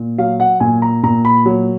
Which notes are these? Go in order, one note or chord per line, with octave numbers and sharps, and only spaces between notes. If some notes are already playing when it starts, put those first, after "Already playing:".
Already playing: A#2
F#3 F5
F#5
A#2 G#5
A#5
A#2 A#5
B5
F#3